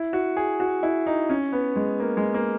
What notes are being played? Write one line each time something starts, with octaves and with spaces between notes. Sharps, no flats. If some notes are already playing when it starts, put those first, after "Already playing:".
Already playing: E4
F#4
G#4
F#4
E4
D#4
C#4
B3
G#3
A#3
G#3
A#3